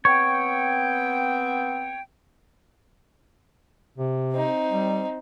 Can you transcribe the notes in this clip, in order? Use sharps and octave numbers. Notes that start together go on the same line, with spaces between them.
B3 C4 C#5 G5
C3
C4 D#4
G3